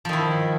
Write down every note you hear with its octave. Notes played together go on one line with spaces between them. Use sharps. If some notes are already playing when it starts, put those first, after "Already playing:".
D#3 F3 E4